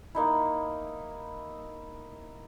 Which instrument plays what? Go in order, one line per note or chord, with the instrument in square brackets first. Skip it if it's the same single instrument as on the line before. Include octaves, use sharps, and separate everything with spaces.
[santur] A#3 D#4 E4